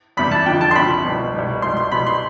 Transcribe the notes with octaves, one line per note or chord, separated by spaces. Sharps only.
E2 C3 G3 B5
A5
F2 D3 F3 G5
A5
C6
C2 C3 F3 B5
C2 B2 G3
C2 B2 G3
C2 B2 G3 C6
C6
C2 B2 G3 B5
C6